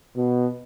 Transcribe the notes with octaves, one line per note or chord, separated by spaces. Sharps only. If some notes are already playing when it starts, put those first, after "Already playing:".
B2